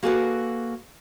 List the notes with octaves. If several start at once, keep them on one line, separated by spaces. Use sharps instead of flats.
A#3 F#4 G#4 A4 B4 D5